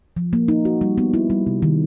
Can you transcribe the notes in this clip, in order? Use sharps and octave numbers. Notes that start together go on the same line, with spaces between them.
F3
A#3
D#4
F#4
G3
B3
E4
G3
C3
D#3